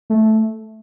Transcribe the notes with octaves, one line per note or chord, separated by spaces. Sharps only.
A3